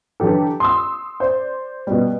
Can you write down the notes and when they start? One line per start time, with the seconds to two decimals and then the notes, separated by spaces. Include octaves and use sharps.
0.20 D3 E3 F#3 G4 A4
0.60 C6 D#6 E6
1.20 C5 D5
1.87 B2 G3